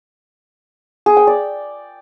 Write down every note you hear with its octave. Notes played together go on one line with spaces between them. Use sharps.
G#4
G5
D5